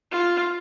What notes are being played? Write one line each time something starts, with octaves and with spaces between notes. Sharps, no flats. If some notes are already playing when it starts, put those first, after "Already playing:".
F4